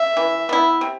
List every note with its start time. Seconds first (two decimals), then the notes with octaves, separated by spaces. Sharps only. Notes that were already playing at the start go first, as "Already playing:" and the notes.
Already playing: E5
0.17 E3
0.49 B3 E4
0.81 C3